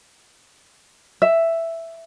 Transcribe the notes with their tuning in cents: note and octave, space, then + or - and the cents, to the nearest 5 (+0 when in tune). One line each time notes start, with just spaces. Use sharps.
E5 +5